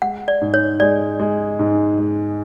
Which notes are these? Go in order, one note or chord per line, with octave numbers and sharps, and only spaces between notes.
G#3 F#5
D5
G#2
C#5
G#3 D5
G#3
G#2
G#3